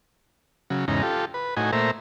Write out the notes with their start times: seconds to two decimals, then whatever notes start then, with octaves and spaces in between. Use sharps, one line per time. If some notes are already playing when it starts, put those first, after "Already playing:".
0.70 C#3 F#3
0.88 E2 G#2 C#3 D#4 A#5
1.02 F4 G4 A4
1.34 B4
1.57 A2 D#4 F#4 G#5
1.73 A#2 A3 C5 E5 A#5